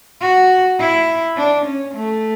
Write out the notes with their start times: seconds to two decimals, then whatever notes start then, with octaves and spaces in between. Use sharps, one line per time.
0.22 F#4
0.79 E4
1.37 D4
1.66 C#4
1.95 A3